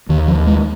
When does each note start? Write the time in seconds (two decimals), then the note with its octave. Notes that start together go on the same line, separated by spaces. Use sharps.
0.09 D#2 D#3
0.28 F3
0.35 D#2
0.47 G#3